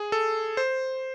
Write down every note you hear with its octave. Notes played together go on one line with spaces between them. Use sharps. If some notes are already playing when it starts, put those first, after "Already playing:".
Already playing: G#4
A4
C5